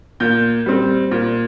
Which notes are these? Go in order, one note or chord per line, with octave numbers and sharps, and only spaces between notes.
A#2 G6
G3 C4
A#2